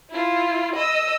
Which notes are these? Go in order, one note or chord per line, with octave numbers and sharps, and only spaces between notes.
E4 F4
D#5 E6